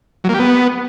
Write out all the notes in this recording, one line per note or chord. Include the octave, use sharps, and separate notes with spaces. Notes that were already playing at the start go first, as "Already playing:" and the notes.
F#3
A#3
G4
B3